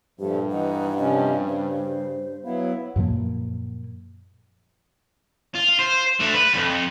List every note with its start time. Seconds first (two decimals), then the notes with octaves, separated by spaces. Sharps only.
0.20 G2 A#2 F3 A3 G4
0.51 E3 D#4 F#5
0.97 C3 F3 C#4 D#5
1.46 C#3 C5
2.44 F#3 B3 E4 F5
2.96 F#2 A#2 F3 A#3
5.55 F4
5.79 C5
6.20 A3 D4
6.34 B4
6.53 C2 F2